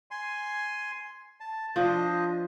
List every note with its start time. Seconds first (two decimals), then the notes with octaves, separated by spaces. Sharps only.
0.11 G#5 C6
1.40 A5
1.76 F3 D4 C5 D#5